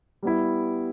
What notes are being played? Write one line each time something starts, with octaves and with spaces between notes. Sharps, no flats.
G3 B3 E4